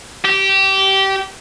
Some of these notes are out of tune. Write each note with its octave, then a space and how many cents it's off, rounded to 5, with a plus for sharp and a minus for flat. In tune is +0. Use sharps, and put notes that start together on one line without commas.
G4 -20